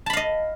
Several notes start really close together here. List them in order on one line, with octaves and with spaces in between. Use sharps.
A5 B5 F5 D#5